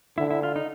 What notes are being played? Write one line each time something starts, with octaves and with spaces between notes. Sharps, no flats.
D3 E4
E4
F4
D#4